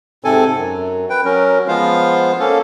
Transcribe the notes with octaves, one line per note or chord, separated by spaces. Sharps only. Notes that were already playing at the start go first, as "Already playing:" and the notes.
G#2 C3 C4 A4 G#5
F#2
B4 G5
F#3 C#4 A#4
F3 G#3 B3 F4 C5 F5
A#3 C#4 A4 F5